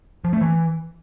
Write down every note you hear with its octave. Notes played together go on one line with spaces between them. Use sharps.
F3
A3
E3